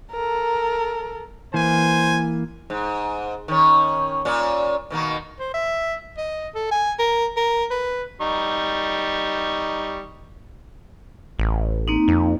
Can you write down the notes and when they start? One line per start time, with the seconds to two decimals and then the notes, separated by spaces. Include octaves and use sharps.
0.12 A4 A#4
1.54 E3 A#3 C5 G#5
2.70 G#2
3.48 D#3 C#4
4.25 A#2 C#4
4.90 B2 D#3 A#3
5.39 C5
5.54 E5
6.17 D#5
6.55 A4
6.71 G#5
6.99 A#4
7.36 A#4
7.71 B4
8.21 G3 D#4 C#6
11.39 A1
11.88 A#3 C4 D#4
12.08 F2